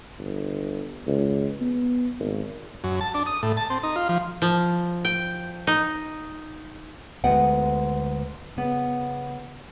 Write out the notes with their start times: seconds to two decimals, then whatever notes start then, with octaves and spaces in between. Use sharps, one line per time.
0.19 G1
1.07 C#2
1.61 B3
2.19 G#1
2.84 F#2
3.01 A5
3.14 D4
3.26 D#6
3.43 A2
3.57 A5
3.70 C4
3.83 D#4
3.96 F4
4.09 F3
4.42 F3
5.05 G5
5.67 D#4
7.24 D2 G#3 B3 F#5 G5
8.57 C#3 B3